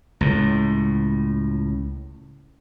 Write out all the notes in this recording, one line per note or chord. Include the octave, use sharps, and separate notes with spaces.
C#2 A2